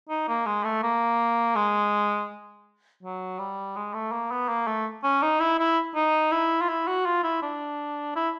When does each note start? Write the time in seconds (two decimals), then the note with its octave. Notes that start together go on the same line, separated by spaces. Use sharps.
0.09 D#4
0.28 A#3
0.46 G#3
0.64 A3
0.83 A#3
1.56 G#3
3.03 F#3
3.39 G3
3.76 G#3
3.94 A3
4.12 A#3
4.31 B3
4.48 A#3
4.67 A3
5.04 C#4
5.22 D#4
5.40 E4
5.59 E4
5.95 D#4
6.32 E4
6.61 F4
6.69 E4
6.88 F#4
7.06 F4
7.23 E4
7.42 D4
8.16 E4